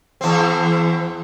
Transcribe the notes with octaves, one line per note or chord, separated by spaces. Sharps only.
E2 C4